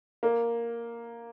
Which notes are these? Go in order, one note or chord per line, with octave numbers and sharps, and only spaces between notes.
A#3